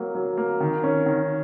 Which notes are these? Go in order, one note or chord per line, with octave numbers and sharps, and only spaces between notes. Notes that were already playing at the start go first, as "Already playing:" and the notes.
Already playing: F#3 A#3
F#3
A#3
D#3
C#4
D#3